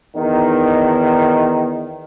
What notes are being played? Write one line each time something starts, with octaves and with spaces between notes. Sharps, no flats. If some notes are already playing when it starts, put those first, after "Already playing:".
E2 D#3